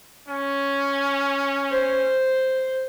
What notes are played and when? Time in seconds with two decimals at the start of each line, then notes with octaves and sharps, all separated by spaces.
0.28 C#4
1.72 C5